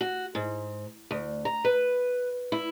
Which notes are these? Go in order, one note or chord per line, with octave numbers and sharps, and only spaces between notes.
F#4
G#2
D2
A#5
B4
E4